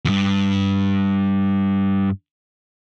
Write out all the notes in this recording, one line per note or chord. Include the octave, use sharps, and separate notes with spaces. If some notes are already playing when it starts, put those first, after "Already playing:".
E2 G2